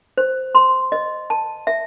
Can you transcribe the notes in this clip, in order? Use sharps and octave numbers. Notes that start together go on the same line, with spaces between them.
C5
C6
D#5
A5
E5